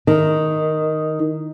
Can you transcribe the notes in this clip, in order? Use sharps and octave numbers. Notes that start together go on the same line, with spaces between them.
D#3